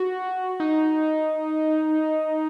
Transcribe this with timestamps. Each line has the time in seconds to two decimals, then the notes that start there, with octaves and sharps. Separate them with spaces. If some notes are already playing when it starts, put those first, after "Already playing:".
Already playing: F#4
0.60 D#4